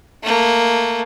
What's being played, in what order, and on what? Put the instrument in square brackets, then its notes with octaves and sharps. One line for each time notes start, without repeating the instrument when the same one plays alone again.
[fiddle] A3 A#3